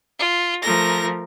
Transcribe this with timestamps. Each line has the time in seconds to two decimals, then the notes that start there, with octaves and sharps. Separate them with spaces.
0.19 F4
0.62 F3 A3 A#4 A#6